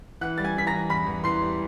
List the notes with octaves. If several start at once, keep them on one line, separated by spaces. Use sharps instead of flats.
E3 F#5 F#6
G3 A6
G#5 G#6
E3 B6
A#5 A#6
E3
E2 B5 B6
E2
E3 C6 C7
G3